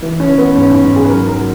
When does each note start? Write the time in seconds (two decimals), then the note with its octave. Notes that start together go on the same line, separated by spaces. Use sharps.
0.02 E3
0.20 C#4
0.29 E3
0.38 B3
0.56 G#2 C#4
0.70 C#4
0.83 G#2
0.96 G#4
1.04 B4
1.09 F#3 A#4
1.28 A#4
1.37 F#3